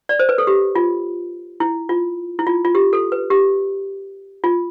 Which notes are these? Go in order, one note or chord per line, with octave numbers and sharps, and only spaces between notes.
D5
C5
B4
A4
G4
F4
E4
F4
E4
F4
F4
G4
A4
B4
G4
F4